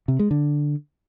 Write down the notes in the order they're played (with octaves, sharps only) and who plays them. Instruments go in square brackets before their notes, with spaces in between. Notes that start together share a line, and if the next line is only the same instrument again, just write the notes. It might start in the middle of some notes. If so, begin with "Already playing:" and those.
[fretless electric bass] C3
G#3
D3